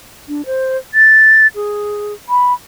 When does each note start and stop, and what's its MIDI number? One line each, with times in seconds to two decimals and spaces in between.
0.28 0.42 62
0.46 0.77 72
0.94 1.47 93
1.55 2.13 68
2.29 2.53 83